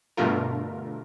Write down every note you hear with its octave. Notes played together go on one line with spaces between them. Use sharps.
G2 B2 D3 A3 F4 A#4